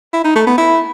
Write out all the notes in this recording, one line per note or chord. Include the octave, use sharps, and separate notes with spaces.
E4
D#4
A3
B3
E4